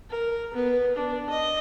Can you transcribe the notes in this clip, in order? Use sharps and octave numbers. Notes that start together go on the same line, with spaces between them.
A#4
B3
D4
D#5